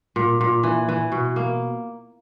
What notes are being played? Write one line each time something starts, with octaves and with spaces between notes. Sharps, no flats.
A#2
A#2
E3
E3
B2
A#3